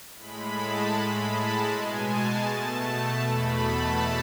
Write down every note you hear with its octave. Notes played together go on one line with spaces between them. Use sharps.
A2 G#3 B5
A5
A2 G#3 B5
A5
B2 G#3 G#5
A5
B2 A3 A5
A5
E2 B2 A3 B5
A5